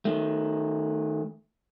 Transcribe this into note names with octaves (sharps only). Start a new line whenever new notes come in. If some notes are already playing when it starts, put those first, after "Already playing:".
D#3 A3